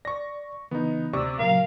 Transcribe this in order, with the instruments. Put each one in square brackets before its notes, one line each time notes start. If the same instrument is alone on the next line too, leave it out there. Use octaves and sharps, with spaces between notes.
[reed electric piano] D5 [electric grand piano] C#6 A#6
[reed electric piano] C#3 E3 [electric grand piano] B3 D#4
[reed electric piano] D2 C4 E6 [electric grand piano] C3 D5 C#6
[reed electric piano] A#2 C#3 F#3 [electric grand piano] A#4 [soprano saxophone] F5